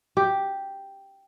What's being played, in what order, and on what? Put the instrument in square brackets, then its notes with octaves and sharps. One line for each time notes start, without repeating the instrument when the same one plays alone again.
[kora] G4